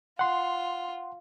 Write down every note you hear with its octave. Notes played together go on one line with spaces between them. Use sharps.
F4 F#5 C6